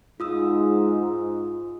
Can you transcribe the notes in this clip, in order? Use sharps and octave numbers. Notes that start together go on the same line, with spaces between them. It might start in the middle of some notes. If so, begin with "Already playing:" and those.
G#2 F4 D#6 E6